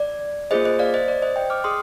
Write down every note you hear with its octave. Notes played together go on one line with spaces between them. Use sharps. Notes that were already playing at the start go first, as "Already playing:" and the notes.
Already playing: D5
A#3 F4 G#4 C5 D#5
C5 D#5
D5 F5
C5 D#5
D5
C5 D#5
D#5 G5
D6 F6
G#4 C6 D#6